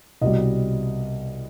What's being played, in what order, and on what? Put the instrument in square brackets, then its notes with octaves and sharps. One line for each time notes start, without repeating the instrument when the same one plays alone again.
[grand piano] C2 B2 G3 D#5